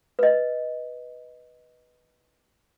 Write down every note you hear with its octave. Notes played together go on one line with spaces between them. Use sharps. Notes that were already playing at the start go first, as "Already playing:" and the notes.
B4 D#5